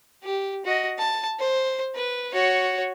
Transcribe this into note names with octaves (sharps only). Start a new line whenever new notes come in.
G4
F#4 D#5
A5
C5
B4
F#4 C#5